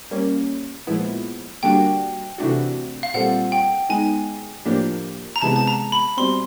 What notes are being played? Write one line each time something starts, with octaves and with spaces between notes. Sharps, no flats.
G3 A#3 C#4
A#2 F3 G#3 B3 E4
D3 G3 A#3 D4 F#4 G5
C3 E3 A3 D4 F#4
F5
A#2 G3 C4 F4 A4 F#5
G5
G#3 B3 D#4 G#5
A2 F3 A#3 D4 G4
A#5
C3 E3 G#3 B3 A5
A5
A#5
B5
B2 G3 C4 C6